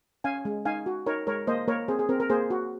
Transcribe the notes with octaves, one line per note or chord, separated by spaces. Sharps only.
C#4 F5 G#5
G#3
D#4 F5 G#5
F#4
D#4 A#4 C#5
G#3 A#4 C#5
A#3 C5 D#5
A#3 A#4 C#5
C4 G#4 C5
G#4
C4 A#4
A#4
A#3 G#4 C5
F#4